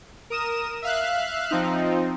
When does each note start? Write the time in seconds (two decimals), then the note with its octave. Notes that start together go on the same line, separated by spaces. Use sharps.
0.30 A#4 D#6 E7
0.82 E5 F5 F#6
1.51 F3 C4 D#4